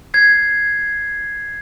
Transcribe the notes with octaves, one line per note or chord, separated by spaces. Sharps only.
G#6 C7